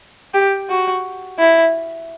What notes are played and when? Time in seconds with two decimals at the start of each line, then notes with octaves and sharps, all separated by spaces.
0.34 G4
0.70 F#4
1.39 E4